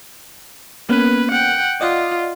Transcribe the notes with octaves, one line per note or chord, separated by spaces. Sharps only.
A#3 B3 C#4 B4
F#5 G5
F4 D5 D#5 F#5